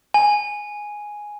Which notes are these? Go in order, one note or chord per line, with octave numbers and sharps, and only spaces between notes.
G#5